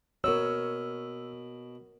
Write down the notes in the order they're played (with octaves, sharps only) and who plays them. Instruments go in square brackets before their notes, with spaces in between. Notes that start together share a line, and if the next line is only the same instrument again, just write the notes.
[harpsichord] B2 [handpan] A#4 C#5 [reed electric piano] E6